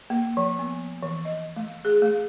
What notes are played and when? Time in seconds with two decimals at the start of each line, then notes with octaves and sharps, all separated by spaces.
0.10 A#3
0.37 F3
0.59 B3
1.03 E3
1.25 D#5
1.56 A3
1.85 G#4
2.02 A3